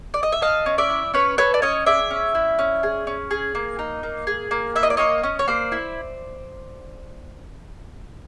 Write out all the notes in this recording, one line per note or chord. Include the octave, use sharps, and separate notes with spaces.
D5
D#5
E5
A4 D#5 F5
C#4
D5 E5
E4
C#4 B4 C#5
A4 B4 C#5
D5
C#4 C#5 D#5
G#4 D5 E5
C#4
E4
C#4
G#4
C#4
G#4
A#3
D#4
A#3
G#4
A#3
E4 E5
D#5
D5
A#3 C#5 D#5
C#4
C#5
A#3 C5 D5
E4